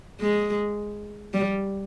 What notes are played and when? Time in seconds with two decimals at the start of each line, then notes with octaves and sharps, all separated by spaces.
0.20 G#3
1.33 G3